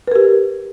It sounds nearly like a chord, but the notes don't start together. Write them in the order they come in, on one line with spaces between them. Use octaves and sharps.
B4 A#4 G4